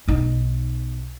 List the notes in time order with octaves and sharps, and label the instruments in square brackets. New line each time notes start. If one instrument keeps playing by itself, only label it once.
[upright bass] B1 D#4